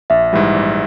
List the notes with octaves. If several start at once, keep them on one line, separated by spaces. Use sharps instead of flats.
A#1 E5
G#2 E3 G3
A#1